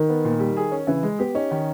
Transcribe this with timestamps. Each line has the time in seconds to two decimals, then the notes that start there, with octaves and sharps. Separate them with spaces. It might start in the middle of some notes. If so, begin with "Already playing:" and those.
Already playing: D#3
0.09 B3
0.25 A#2
0.40 G3
0.57 G#4
0.72 C#4
0.87 C#3 E3
1.03 G#3
1.19 B3 G4
1.35 C#4 D#4
1.51 D#3